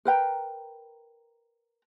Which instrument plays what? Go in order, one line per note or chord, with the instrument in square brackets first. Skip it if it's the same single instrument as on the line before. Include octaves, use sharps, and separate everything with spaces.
[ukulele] A#4 B4 G5 A#5